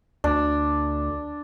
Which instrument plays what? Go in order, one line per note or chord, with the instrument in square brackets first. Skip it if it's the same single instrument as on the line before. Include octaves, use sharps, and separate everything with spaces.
[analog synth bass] D2 [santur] D4